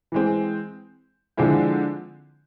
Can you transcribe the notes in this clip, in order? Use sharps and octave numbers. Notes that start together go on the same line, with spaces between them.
E3 G#3 C4
D3 F3 G#3 C4 E4